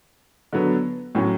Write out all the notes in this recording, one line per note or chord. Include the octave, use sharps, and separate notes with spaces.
D3 F#3 B3
A2 F#3 C#4